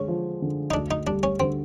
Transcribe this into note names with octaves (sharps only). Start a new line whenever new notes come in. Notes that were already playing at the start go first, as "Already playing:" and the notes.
Already playing: D3 G#3 C#4
F3
D3
D#4
D2 D4
D#4
G3 D4
C#4
D3 C4